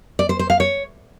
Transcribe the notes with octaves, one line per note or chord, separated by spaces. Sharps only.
D5
C5
C5
F5
C#5